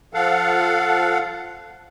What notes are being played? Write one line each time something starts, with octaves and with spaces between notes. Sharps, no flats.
F3 A4 F5 F#5